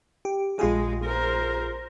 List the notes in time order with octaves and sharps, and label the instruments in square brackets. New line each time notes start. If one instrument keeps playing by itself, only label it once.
[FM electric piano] G4
[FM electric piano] A#1 F4 G#4 [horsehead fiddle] G#3
[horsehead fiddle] A#4 C5